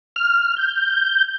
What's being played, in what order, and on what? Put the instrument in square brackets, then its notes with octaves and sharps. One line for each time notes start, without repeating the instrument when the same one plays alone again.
[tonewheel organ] F6
G6